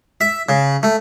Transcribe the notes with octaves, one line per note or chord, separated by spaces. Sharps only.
E5
C#3
A3